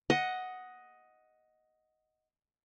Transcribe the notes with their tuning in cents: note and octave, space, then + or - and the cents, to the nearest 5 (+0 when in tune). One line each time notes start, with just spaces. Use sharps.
D#5 +10 F#5 +0